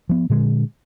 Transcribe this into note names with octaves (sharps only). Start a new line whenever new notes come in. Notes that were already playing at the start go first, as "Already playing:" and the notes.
F3 B3
A#2 D3 G#3